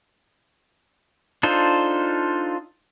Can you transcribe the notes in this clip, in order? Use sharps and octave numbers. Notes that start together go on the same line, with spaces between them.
D4 D#4 F4 A4 C5